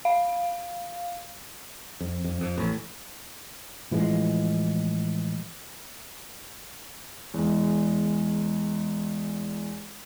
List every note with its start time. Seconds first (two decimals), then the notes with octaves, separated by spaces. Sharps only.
0.05 F5
2.01 F2
2.24 F2
2.41 F2
2.58 A1
3.91 A2 E3 F3 G#3
7.34 E2 G#3